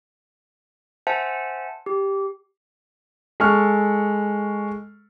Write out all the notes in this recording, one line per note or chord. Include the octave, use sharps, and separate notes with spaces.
C5 E5 F#5 G#5 A5
G4
G#3 A4 C#6 F6